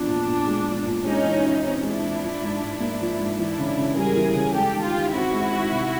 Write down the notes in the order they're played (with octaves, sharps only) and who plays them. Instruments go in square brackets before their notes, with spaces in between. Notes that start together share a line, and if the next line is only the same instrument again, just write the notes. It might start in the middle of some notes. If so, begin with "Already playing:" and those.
Already playing: [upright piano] E2 F3 [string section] D4
[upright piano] A#2
A#2
G#3
F3
A#2
[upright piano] G#3 [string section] C#4 D#4
[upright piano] E3
E4
[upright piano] C4 [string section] C#4 D#4
[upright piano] G#3
[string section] D4 E4
[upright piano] E3
F3
G#2
G#2
A#3
F3
G#2
[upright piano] E3 [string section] D4 E4
[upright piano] C#3
C#3
[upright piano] G3 [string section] G#4 A#4
[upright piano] E3
C#3
[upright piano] G#3 [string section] G4 A4
[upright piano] D#3
[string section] F4 G4
[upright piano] D#3
[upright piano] C4 [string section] E4 F#4
[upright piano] G#3
D#3
C3